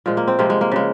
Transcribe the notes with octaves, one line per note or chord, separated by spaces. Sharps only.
A#2 F3 G#3
A#3
C4
C3 F3 G#3 A#3
G#3
A#3
C#3 G#3